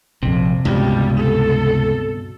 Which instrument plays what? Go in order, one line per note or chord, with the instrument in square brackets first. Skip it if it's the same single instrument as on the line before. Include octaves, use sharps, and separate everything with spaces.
[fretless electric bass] A#1 F2 [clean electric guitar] C3
[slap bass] C#2 [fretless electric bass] G2 B2 [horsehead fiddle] G3
[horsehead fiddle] A4